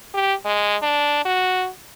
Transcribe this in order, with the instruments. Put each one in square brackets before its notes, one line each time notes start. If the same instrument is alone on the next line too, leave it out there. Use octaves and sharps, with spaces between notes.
[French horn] G4
G#3
D4
F#4